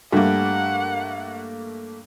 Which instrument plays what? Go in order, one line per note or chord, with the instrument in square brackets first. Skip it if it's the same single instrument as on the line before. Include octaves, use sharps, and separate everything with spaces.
[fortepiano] G2 [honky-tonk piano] A3 A#3 [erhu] F#5